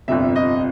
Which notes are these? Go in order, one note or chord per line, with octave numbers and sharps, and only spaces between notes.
G1 F2 C3 E5
D#5